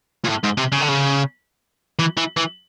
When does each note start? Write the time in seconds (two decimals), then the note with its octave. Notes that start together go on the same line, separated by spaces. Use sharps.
0.25 A#2
0.29 A2
0.44 G#2
0.58 C3
0.72 C#3
0.81 D3
0.88 C#3
1.99 E3
2.17 E3
2.37 E3